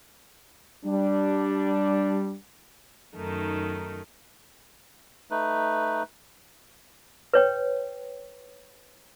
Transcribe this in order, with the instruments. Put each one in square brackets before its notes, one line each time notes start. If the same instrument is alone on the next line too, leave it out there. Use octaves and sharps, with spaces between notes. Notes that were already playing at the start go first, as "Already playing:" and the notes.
[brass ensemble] G3 D4
[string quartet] F#2 D#3 A3 D#4
[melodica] A3 D#4 B4
[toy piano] B4 C#5 G5